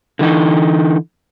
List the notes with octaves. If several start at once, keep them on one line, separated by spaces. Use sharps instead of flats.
D3 E3 D#4